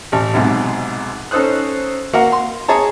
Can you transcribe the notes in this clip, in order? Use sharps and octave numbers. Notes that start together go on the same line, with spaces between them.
A1
B1 G#2 C3
C#4 D#4 A4 C5 D#6 F#6
A#3 F#4 A#4 F5 F#5
C6
G#4 C#5 A5 A#5